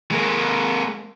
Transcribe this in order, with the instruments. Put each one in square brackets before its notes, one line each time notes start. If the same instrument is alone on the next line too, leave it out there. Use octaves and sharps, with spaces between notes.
[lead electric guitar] G#3 A#3